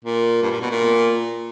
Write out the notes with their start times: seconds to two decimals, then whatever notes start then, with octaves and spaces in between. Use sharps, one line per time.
0.05 A#2
0.42 G2
0.52 A#2
0.61 B2
0.71 A#2